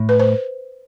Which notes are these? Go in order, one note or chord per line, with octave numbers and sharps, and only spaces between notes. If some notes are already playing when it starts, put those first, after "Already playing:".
Already playing: A2
B4
C5